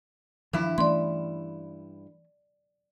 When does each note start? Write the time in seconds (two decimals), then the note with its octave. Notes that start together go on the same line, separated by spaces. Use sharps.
0.53 G2 D#3 F3 E4
0.78 E3 A3 C#4 D5 C6